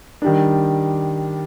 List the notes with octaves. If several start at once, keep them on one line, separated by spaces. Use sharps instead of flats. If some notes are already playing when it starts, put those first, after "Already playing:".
D#3 G3 D4